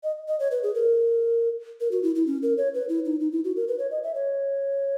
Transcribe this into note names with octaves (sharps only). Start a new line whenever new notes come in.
D#5
D#5
C#5
B4
G#4
A#4
A#4
F#4
E4
E4
C#4
A#4
C#5
B4
E4
D#4
D#4
E4
F#4
A#4
B4
C#5
D#5
E5
C#5